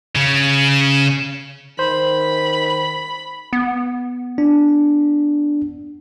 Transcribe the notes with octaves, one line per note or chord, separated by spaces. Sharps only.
C#3 C#4
D#3 C5 B5
B3
D4